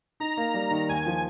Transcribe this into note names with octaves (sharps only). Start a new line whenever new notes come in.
D#4 A#5
A#3
G3
D#3
D#2 G#5
F3